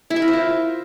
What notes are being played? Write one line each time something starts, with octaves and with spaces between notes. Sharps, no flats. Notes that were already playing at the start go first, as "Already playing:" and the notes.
E4
E5
A#4
C5
F4